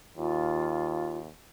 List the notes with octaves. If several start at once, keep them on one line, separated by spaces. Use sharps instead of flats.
D#2 F4